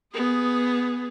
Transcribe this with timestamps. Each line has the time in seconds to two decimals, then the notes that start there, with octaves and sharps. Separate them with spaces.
0.13 B3 G#4